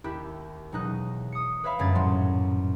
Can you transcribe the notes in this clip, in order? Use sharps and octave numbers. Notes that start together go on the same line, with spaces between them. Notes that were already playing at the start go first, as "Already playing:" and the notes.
D#2 E4 G4 F#6
E1 F#3 D#4 F#6
D#6 C#7
B4 C#5 E5 F5 B5
G1 F#2 G#3 G#6 A6
D#1 A2 F#3 C6